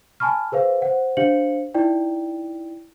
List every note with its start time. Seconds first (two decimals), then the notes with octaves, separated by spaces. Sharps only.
0.20 G#5 A5 B5 C#6 F6
0.52 G#4 B4 C5 F5
0.82 C5 F#5
1.17 D4 G4 C5 F5 C#7 F#7
1.74 D#4 E4 D5 G5